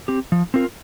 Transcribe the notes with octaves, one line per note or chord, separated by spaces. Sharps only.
C4 G4
F3
C4 F4 A#4